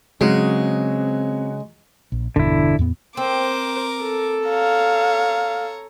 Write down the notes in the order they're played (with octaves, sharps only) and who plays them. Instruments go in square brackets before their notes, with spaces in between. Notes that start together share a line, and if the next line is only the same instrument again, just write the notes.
[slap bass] C#3 [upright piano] F#3 F#4 [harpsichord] G#3 [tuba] C4
[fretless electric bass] A#1
[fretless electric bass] G1 E2 B2 [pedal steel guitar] D3 E4
[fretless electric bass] E2 A2 B3
[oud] C4 [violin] A#4 D6 [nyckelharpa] C5
[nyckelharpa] A4
[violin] C#5 A#5 [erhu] F5